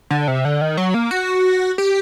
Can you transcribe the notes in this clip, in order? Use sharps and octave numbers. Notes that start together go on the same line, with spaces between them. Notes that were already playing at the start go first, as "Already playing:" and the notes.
D3
C3
D3
D#3
F#3
A#3
F#4
G4